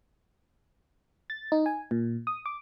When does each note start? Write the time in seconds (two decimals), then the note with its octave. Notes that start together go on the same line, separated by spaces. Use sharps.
1.30 A6
1.52 D#4
1.66 G#5
1.91 A#2
2.27 D#6
2.46 D6